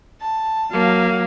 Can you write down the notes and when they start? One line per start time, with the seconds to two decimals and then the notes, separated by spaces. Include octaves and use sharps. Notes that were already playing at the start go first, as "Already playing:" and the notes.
0.21 A5
0.72 F#3 A#3 F5